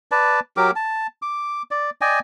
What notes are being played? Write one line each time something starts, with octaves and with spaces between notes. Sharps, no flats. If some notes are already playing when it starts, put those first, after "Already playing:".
B4 D5 A5
F#3 G4 A#4 D6
A5
D6
D5
D5 D#5 G5 G#5